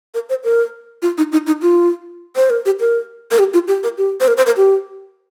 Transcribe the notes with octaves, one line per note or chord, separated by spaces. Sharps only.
A#4
C5
A#4
F4
D#4
D#4
D#4
F4
C5
A#4
G4
A#4
A#4
G4
F4
G4
A#4
G4
C5
A#4
C5
A#4
G4